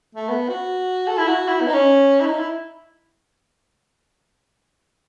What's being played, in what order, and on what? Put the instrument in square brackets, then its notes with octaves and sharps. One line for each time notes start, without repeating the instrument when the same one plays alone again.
[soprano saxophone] A3
B3
F#4
A4
E4
F#4
E4
B3
D#4
C#4
E4
D#4
E4